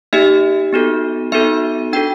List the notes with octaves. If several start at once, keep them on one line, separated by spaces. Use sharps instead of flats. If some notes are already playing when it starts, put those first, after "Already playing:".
A#3 D#4 G4 E5
B3 D#4 F#4 A4
B3 D#4 F#4 A4 E5
D4 F#4 A4 G5